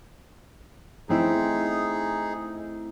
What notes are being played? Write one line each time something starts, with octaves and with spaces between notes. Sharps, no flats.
A3 C4 D#4 E4 G#4